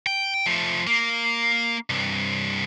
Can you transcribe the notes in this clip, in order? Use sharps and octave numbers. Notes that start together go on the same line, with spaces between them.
G5
F3 A3
A#3
C2 G2